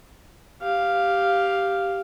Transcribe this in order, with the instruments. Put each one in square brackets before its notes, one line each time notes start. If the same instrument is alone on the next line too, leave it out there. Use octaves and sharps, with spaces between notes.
[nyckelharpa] G4 F5